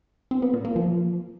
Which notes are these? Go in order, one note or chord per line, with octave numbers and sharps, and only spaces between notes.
C4
B3
A#2
A#3
F3